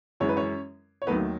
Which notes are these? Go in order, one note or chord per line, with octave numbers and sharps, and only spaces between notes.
F#2 E3 G#3 C#5
B4
C#4 C#5
C#5
D#2 D#3 F#3 A3 B3 B4